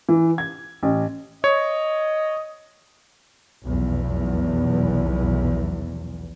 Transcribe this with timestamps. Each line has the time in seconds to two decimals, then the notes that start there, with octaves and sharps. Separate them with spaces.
0.09 E3
0.38 G#6
0.83 A1
1.44 C#5 D#5
3.64 F1 B1 E2